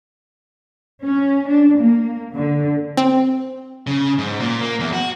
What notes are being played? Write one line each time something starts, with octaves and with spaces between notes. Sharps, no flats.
C#4
D4
A#3
D3
C4
C#3
G#2
A#2
A#3
E2
F#4